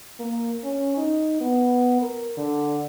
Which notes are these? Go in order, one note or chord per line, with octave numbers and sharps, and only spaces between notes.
A#3
C#4
D#4
B3
A#4
D3